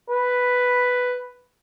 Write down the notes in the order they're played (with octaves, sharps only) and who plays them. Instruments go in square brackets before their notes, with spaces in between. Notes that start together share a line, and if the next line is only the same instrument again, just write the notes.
[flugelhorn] B4